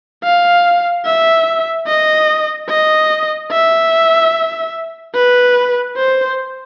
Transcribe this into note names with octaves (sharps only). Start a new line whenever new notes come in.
F5
E5
D#5
D#5
E5
B4
C5